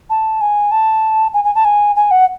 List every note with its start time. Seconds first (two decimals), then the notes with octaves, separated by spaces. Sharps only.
0.09 A5
0.41 G#5
0.71 A5
1.33 G#5
1.44 G#5
1.55 A5
1.64 G#5
1.95 G#5
2.11 F#5